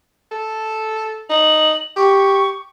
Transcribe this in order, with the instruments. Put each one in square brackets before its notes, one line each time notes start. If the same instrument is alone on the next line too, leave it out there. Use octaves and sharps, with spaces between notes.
[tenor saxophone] A4
[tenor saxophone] D#4 [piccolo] F#7
[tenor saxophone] G4 [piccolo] C#6